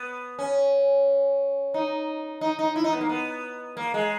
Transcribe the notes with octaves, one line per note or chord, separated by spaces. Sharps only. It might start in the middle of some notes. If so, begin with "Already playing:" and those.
Already playing: B3
C#4
D#4
D#4
D#4
E4
D#4
B3
A#3
B3
A#3
G#3